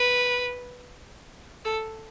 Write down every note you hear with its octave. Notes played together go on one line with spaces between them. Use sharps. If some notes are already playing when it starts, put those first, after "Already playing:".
Already playing: B4
A4